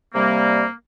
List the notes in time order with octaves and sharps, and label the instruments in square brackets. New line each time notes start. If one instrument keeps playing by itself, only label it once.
[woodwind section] C3 G3 A#3